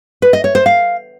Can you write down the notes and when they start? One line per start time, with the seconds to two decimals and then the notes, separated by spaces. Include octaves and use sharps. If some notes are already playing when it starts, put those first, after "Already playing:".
0.22 B4
0.33 D#5
0.44 C#5
0.55 C5
0.66 F5